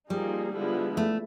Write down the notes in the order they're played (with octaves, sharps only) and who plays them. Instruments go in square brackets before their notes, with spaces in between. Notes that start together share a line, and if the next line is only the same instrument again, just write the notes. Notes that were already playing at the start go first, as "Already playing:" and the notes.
[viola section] F3 A#3 D#4 G#4 [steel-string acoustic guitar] G3
[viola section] D3 F3 G#3 B3 E4
[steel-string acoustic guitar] A3